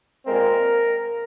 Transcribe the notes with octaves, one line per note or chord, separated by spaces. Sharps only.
A#2 G#3 C4 A#4